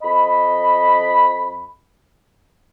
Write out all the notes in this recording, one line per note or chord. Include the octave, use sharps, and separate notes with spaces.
F2 D#5 B5